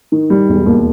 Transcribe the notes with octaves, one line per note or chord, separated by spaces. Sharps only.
D#3
G3
E1
D#2